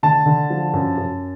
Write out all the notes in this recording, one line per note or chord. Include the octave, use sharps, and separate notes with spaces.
D3 A5
D3
F3
F#2
F#2